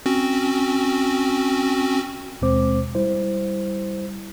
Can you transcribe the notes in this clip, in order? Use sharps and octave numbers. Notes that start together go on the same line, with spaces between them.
C4 C#4 F#4
D#2 B2 G#3 C4 C5 D6
G3 E4 C5